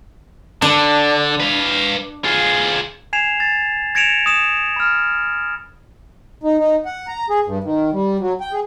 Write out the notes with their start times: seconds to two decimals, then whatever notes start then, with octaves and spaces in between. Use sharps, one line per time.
0.62 D3 D4
1.40 B4 F5
2.25 F4 G#4
3.13 G#5 G#6 C7 E7 F7
3.40 A6
3.95 G#6 A#6 C#7 D7 E7 F7
4.26 D#6 E7
4.76 B5 F6
6.43 D#4
6.58 D#4
6.85 F#5
7.08 A#5
7.30 G#4
7.46 G2
7.64 D#3
7.92 G3
8.19 F#3
8.40 G5
8.53 G#4